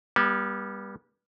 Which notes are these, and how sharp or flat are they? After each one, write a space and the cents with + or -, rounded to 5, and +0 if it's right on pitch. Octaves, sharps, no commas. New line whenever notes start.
G3 +15 B3 -35